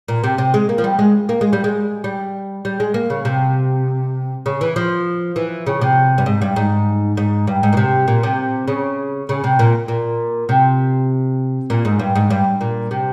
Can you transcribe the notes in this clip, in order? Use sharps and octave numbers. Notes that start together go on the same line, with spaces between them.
A#2
C3
C3
G#3
A#3
F3
G3
G#3
A#3
G#3
G3
G#3
G3
G3
G#3
A#3
C#3
C3
C#3
E3
F3
E3
C#3
C3
G2
G#2
G2
G#2
G#2
G2
G#2
A#2
C3
A#2
C3
C#3
C#3
C3
A#2
A#2
C3
A#2
G#2
G2
G#2
G2
A#2
C3